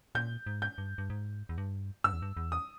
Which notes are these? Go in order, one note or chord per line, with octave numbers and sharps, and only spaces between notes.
A#2 G6
G#2
G6
G2
G2
G#2
E2
G2
G2 E6
E2
G2
E2
D#6